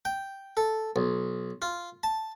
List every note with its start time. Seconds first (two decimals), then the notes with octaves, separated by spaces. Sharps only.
0.05 G5
0.57 A4
0.96 B1
1.62 F4
2.03 A5